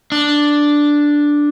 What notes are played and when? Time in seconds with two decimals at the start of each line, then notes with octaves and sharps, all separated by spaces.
0.12 D4